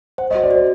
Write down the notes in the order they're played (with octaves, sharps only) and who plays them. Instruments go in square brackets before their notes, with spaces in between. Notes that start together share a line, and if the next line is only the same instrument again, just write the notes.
[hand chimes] C5 [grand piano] F#5
[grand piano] D#5
[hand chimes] F#4
[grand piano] D5
[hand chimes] F#4 [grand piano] C5